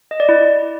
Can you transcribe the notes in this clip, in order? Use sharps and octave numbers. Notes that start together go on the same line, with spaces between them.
D#5
D5
E4